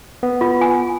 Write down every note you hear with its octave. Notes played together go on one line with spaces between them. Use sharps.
B3
F4
G#5